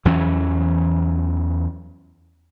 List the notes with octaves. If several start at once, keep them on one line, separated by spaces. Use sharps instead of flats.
E2 E3 F#3 C#4